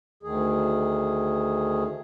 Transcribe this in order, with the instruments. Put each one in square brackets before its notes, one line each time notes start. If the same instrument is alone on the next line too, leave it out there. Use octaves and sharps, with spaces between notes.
[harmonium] D2 D#3 G#4